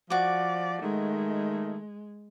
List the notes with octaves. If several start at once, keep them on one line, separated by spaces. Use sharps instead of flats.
F3 F#4 D5 D6
D#3 G#3 A3